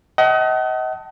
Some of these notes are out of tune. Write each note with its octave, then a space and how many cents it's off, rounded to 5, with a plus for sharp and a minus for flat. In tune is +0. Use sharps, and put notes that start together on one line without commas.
D#5 +30 F#5 +40 A5 +0